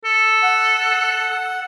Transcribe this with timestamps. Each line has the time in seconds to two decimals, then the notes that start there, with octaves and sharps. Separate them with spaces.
0.05 A4
0.43 F#5